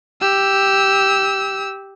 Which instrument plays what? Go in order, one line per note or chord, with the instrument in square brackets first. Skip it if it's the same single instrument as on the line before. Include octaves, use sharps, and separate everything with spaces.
[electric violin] G4 E6